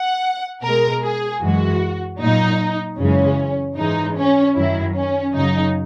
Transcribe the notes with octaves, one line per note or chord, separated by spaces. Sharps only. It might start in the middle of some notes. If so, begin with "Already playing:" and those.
Already playing: F#5
B2 G#3 A#4
G#4
F#2 E3 G#3 F#4
A#2 F#3 D#4
F#2 C#3 E3 G#3 C#4
G#2 E3 G#3 D#4
C#4
F#2 D#3 F#3 E4
C#4
F#2 C#3 F#3 D#4